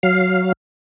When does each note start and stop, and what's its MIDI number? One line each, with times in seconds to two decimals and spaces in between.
0.03 0.52 54
0.03 0.52 77